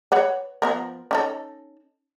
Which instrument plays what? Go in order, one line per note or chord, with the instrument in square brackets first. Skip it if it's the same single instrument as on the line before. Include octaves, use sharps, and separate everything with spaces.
[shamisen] B4 C#5 F#5
F3 B3 A#4
C#4 D#4 A4